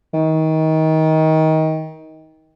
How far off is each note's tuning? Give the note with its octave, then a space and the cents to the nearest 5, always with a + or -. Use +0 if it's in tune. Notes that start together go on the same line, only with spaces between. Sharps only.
D#3 +25